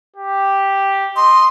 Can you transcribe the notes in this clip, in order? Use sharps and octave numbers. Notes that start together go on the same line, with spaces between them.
G4
D#5 C6